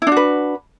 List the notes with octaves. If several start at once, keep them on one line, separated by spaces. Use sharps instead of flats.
D4 E4 F#4 B4